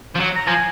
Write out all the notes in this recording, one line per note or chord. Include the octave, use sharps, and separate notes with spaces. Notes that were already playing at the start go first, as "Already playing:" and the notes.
F3
F#3
A#5
F3 G#5